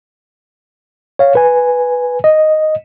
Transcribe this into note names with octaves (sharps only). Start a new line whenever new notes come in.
C#5 F5
B4 G#5
D#5